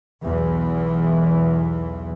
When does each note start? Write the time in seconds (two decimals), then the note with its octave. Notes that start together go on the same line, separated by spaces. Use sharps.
0.25 B1 E2 E3